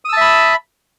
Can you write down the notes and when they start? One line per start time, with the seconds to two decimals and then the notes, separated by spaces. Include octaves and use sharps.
0.05 D#6
0.09 E6
0.13 A5
0.17 E5
0.21 B5